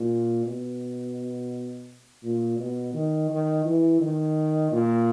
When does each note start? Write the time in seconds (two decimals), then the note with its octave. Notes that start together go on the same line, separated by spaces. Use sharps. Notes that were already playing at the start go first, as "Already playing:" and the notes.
Already playing: A#2
0.46 B2
2.23 A#2
2.59 B2
2.94 D#3
3.30 D#3
3.65 E3
4.01 D#3
4.72 A#2